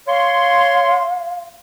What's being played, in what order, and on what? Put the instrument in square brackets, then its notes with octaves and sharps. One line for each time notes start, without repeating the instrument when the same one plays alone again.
[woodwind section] C#5 C6 [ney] F5